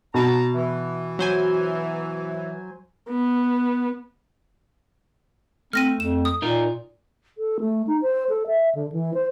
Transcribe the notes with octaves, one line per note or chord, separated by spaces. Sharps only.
B2 A5 A#5
E3
F#3 C5 G#5
B3
A3 C4 F6 A#6 D#7
F2 E7
D#6
A#2 D#4 F4 A#4
A4
A3
D#4
C5
A4
E5
D3
E3
C5